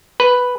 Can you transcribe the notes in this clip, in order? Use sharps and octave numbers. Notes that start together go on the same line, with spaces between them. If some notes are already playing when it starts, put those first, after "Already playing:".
B4